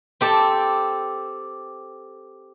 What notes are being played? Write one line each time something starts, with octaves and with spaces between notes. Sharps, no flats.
C4 G4 A4